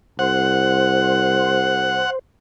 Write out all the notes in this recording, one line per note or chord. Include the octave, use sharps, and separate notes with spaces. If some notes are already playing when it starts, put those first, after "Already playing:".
C2 C5 F#5